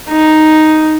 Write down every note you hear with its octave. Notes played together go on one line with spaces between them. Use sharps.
D#4